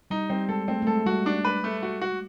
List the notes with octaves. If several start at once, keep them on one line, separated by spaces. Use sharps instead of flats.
G3 D#4
G3 C4
G#3 A4
A3 C4
A3
G#3 A4
G3 F#4
D4
B4
A3
F#4
F#4